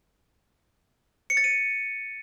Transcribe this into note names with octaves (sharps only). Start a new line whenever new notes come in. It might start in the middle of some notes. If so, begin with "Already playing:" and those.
C#7
A6
D#7